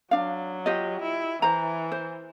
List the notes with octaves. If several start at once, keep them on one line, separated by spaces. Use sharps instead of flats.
F#3 D4 F5
F4 G4 D#5
E4
E3 C5 A#5
C5